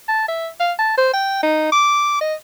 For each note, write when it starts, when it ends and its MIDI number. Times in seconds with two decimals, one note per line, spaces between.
0.08 0.27 81
0.28 0.48 76
0.60 0.73 77
0.79 0.96 81
0.97 1.13 72
1.13 1.43 79
1.43 1.70 63
1.72 2.18 86
2.21 2.34 75